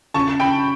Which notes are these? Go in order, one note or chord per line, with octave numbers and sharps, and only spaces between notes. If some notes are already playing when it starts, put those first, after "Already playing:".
C#3 A5 C#6
C#3 G5 B5